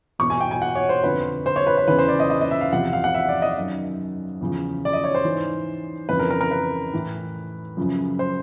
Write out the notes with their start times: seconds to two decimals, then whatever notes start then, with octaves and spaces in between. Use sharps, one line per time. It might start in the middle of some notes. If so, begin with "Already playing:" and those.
0.19 E2 B2 C#6
0.30 G#5
0.40 G5
0.51 G#5
0.62 F#5
0.75 C#5
0.89 C5
1.04 F2 D3 F3 B4
1.46 C5
1.56 C#5
1.67 B4
1.77 B4
1.88 E2 C#3 E3 B4
1.98 C5
2.08 D5
2.20 D#5
2.30 D#5
2.41 D#5
2.51 E5
2.61 F5
2.72 E2 C3 F3 F#5
2.93 F5
3.04 F#5
3.14 E5
3.29 D5
3.42 D#5
3.56 F#2 D#3
4.41 E2 C#3 F3
4.85 D5
4.93 D#5
5.04 C#5
5.15 C5
5.25 G#2 E3
6.09 F2 C#3 E3 B4
6.19 A#4
6.30 A#4
6.41 A#4
6.51 B4
6.93 A2 E3
7.77 F#2 C#3 F3
8.19 C5